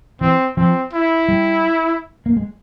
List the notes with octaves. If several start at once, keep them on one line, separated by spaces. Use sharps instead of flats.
E3 C4
F3 C4
E4
G3
A#3
G#3